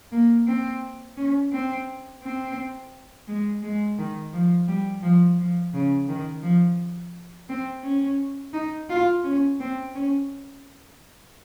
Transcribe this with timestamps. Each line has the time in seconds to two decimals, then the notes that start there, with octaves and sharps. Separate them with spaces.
0.12 A#3
0.47 C4
1.17 C#4
1.53 C4
2.23 C4
3.28 G#3
3.63 G#3
3.98 D#3
4.33 F3
4.68 G3
5.02 F3
5.39 F3
5.74 C#3
6.08 D#3
6.43 F3
7.49 C4
7.84 C#4
8.53 D#4
8.90 F4
9.24 C#4
9.60 C4
9.95 C#4